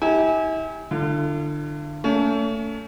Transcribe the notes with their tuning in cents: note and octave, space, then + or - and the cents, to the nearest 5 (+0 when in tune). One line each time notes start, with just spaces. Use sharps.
E4 -40 G4 +0 G#5 +0
D3 +20 F4 -40
A3 +25 C#4 +35